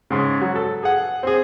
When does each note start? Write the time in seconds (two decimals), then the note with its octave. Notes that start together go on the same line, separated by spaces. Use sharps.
0.10 G#2 C#3
0.42 F#3
0.56 A4
0.83 G#4 F#5
1.23 C4 G#4